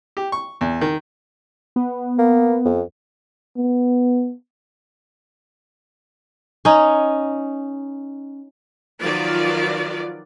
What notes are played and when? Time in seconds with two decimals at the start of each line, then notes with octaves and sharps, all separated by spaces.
0.17 G4
0.32 C#6
0.61 E2
0.81 D#3
1.76 B3
2.18 A#3
2.65 F2
3.57 B3
6.65 C#4 D#4
9.00 D#3 F3 F#3 F4 B4 D5